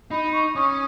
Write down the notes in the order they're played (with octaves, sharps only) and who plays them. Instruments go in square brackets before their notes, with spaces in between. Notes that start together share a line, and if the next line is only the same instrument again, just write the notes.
[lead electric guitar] D#4 [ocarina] B5
[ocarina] C#6
[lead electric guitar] C#4 [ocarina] D#6